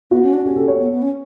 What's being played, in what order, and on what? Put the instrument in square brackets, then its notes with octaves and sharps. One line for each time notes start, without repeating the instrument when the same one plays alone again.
[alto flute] B3 [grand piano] F#4
[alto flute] C#4
D4
[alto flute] C#4 [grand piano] G4
[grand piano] A4
C#5
[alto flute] B3
B3
C#4